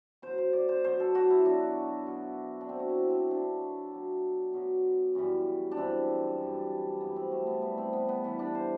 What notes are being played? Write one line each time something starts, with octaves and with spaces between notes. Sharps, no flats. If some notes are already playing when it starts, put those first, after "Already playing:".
B2 F#3 C5
C5
D5
C5
B2 F#3 C5
A4
F#4
E4
B2 F#3 D4
B2 F#3
D4
B2 F#3 C4
F#4
E4
C4
B2 F#3 D4
B2 F#3
B2 F#3
F#2 E3 G3
D4
F#2 E3 G3 C4
F#2 E3 G3
F#2 E3 G3 B3
C4
A3
B3
A2 E3 G3 B3
C4
B3
B3
A2 E3 G3 B3
D4
C5